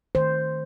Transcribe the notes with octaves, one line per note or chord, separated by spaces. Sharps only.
D#3 A3 C5